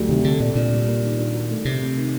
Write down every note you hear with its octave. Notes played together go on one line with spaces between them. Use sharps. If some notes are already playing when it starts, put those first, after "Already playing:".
Already playing: D2 F#3 G3
C3 D#3
D3 A4
A#2 D5
A#2 D4
G3
A#3
D#3
D4
F#4
A3
C3 A3
C4
D#3